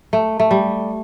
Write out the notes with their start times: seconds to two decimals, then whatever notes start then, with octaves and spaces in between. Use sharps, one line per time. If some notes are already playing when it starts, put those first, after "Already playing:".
0.13 A3
0.40 A3
0.51 G3